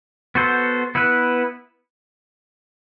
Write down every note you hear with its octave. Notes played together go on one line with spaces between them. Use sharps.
B3 F#4 A4 C5
B3 E4 B4